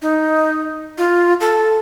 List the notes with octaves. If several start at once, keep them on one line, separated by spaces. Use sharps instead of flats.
D#4
F4
A4